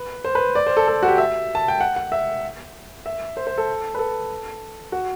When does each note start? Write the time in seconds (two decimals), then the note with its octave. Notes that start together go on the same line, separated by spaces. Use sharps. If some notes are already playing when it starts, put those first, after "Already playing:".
Already playing: B4
0.24 C5
0.35 B4
0.55 D5
0.67 C5
0.77 A4
0.88 A4
1.03 F#4
1.08 G4
1.18 E5
1.55 A5
1.68 G5
1.81 F#5
1.96 F#5
2.12 E5
3.06 E5
3.37 C5
3.47 C5
3.58 A4
3.95 B4
3.99 A4
4.92 F#4